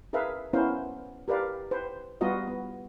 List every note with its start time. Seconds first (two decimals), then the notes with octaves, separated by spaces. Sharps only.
0.13 G#4 A#4 B4 E5 F5
0.53 B3 C#4 E4 A#4 C5 F5
1.28 G4 A#4 B4 D5 F5
1.71 B4 C5
2.21 G3 B3 F4 F#4 D#5
2.47 B3